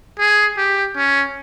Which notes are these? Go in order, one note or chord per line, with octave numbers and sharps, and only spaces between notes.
G#4
G4
C#4